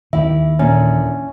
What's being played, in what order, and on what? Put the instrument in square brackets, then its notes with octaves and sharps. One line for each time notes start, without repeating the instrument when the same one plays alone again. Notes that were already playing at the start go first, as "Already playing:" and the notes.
[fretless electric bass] D#2 D#3 [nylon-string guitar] E4 G4 [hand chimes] E5
[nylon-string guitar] A#2 D3 E3 [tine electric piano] C#4